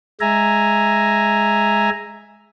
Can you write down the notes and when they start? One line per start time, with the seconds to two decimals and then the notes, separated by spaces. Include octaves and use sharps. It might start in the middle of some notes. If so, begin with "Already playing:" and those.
0.21 G#3 E5 G#5 A#5